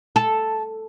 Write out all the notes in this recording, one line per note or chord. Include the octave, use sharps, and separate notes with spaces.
A4